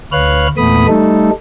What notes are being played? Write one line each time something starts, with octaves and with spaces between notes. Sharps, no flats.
D2 B4 C#5 F5 F6 F#6
E2 A#2 A3 B3 B5 D#6
G3 A3 D#4 A4